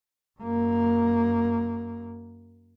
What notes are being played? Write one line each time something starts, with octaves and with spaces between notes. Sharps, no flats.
F#2 A#3